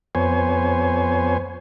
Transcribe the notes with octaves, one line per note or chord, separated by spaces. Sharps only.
F2 B3 C5 C#5 G#5